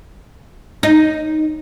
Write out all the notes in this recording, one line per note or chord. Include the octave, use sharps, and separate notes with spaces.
D#4